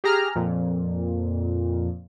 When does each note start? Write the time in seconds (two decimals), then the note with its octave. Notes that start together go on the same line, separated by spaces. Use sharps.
0.04 G4 G#4 A#5 F6
0.36 F2 A#2